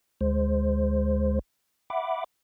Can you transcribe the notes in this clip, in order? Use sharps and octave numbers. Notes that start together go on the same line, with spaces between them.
D2 G#3 C5
E5 F#5 B5 D6